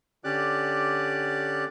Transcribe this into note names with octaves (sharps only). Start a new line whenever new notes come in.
D3 C#4 G4 D5 D6 F#6